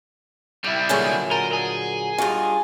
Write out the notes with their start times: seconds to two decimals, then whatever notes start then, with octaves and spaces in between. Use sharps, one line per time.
0.64 G3 E4 D5
0.89 A#2 D3 F#3 G#4 G#5 C#6
1.31 A#4 A5 A#5 C6 D#7 G7
1.53 G#4
2.18 G2 F4 F#4 D#5 G#5 A5